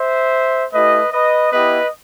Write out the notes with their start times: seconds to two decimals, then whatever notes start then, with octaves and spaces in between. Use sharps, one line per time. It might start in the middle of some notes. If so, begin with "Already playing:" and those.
Already playing: C5 E5
0.73 A3 E4 G4 B4 D#5
1.12 B4 D#5
1.51 B3 E4 G4 B4 D#5